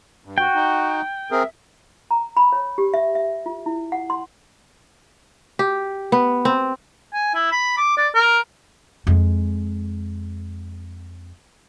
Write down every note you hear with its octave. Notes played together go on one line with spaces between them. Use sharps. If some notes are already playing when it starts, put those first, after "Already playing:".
G2
F#4 G5
D#4
C4 G#4 A#4 E5
A#5
B5
C#5
G4
E5
E5
F4
E4
F#5
C6
G4
B3
C4
G#5
E4
B5
D6
D5
A#4
F2 G#3